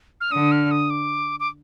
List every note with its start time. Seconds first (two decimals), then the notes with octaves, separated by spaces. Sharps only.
0.21 F6
0.32 D3 D#6
0.52 F6
0.71 D#6
0.90 D6
1.40 D6